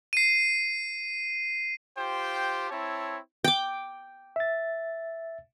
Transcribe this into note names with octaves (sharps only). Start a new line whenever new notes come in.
C7 D#7
F4 G4 C5 G5
C4 E4 C#5 A5
G5 D6
E5 A6